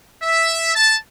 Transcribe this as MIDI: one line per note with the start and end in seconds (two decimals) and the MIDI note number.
0.22 0.71 76
0.75 0.96 81